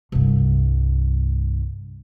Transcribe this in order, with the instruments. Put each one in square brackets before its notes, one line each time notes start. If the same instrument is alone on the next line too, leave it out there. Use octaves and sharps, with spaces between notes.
[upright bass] C2 G2